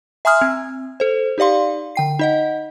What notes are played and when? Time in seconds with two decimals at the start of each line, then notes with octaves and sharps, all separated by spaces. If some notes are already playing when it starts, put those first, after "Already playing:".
0.25 E5 G#5 A#5 C6 D#6 F6
0.41 C4
1.00 A4 C5
1.38 D#4 G4 D5 F5 C6
1.96 D3 G5 C7
2.19 D#4 D#5 F#5